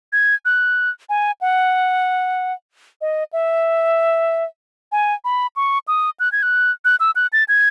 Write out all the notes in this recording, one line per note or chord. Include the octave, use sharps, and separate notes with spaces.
G#6
F#6
G#5
F#5
D#5
E5
G#5
B5
C#6
D#6
F#6
G#6
F#6
F#6
E6
F#6
A6
G#6